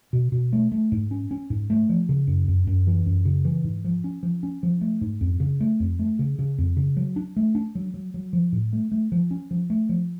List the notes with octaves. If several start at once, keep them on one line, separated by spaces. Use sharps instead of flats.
B2
B2
A3
A3
G#2
C#4
C#4
G#2
A3
F3
C#3
F#2
F#2
F#2
E3
F#2
C#3
E3
G#2
F3
C#4
F3
C#4
F3
A3
G#2
F2
C#3
A3
F2
A3
C#3
C#3
F2
C#3
F#3
D4
A3
D4
F#3
F#3
F#3
F3
A2
A3
A3
F3
C#4
F3
A3
F3